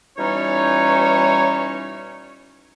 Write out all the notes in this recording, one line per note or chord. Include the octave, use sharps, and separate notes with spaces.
B2 E3 G3 C#4 D#4 C#5